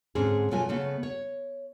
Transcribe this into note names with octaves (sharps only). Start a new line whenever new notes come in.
G#2 D3 C4 C#4 G#4
B2 F#3 A3 F4 G#5
C#3 A3 B3
C#5